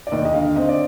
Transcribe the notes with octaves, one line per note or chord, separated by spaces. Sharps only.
D5
D#2 D#5
D#5
D3 F5
C4 D#5
D5